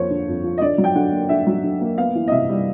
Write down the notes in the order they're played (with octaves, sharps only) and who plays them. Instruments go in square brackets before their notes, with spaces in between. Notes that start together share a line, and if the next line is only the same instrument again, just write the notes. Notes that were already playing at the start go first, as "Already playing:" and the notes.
Already playing: [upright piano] F2 F3 A#3 C5 C#5
D3
F2
F3
D#5
D3 D5
F#3
G5
D3 F#5
A#3
D3 E5
F#3
D3
A#3
B3 F5
E3
D#5
C3 E5
G3